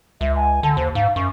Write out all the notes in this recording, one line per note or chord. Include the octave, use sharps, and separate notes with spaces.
C#2 E5
G#5
D3 A5
D#2 C5
G#2 F5
F#2 C#6